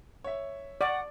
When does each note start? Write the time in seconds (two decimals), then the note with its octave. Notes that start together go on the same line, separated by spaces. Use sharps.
0.24 C#5 E5
0.81 D5 F#5 C#6